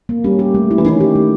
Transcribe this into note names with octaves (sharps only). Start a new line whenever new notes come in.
A#3
G3 C#4
G4
A3
E4
E3
D#3 C#4
G4
A3